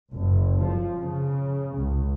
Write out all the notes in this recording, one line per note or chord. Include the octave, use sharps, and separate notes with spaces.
F#1
F3
C#3
C#2